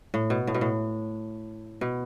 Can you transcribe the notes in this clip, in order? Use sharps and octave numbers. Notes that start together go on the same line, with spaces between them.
A2
B2
A2
B2
A2
B2